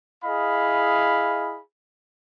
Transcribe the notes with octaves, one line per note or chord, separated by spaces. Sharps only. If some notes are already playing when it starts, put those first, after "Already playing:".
E4 G#4 D#5 F5 B5